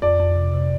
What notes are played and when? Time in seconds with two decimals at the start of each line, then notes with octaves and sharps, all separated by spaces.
0.02 F2 D5
0.20 F2
0.36 C3
0.53 C3